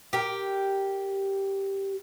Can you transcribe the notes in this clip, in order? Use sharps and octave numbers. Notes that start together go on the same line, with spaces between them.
G4 A#4